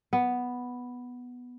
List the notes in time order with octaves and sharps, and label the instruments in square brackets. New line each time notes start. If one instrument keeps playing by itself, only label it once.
[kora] B3